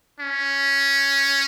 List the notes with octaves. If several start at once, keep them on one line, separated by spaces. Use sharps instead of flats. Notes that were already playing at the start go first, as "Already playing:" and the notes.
C#4